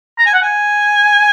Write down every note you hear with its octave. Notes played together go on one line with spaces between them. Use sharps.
A#5
G#5
F#5
G#5